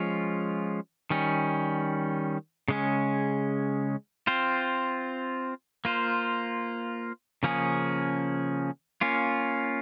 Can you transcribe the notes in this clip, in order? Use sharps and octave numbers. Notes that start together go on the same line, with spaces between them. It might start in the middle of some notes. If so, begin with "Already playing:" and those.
Already playing: F3 G#3 C#4 F4
D#3 G3 C#4
C#3 G#3 C#4
C4 F4 C5
A#3 F4 C5
C#3 F3 A#3 C#4 G#4
A#3 C#4 F4